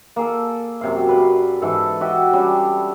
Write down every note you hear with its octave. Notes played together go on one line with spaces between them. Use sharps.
A#3 G#4 A4
F#2 C3 F5
B4 D5
G#2 E3 A4
F#4 G4 D#5 E5
G3 C#4 D4